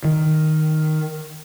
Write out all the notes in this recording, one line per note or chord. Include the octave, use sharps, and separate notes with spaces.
D#3